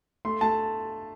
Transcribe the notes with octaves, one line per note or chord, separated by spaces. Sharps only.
A3 C6
A3 A5